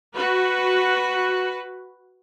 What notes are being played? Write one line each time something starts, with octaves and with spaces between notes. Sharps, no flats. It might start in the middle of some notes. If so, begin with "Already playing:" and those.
F#4 B4